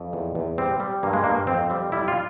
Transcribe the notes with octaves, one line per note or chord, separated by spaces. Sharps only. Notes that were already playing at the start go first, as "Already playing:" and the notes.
Already playing: F2
E2
E2
G3 C4
G3
G2 A#3
G#3
G2 A#3
F2 C4
G3 C4
G3 E4
F4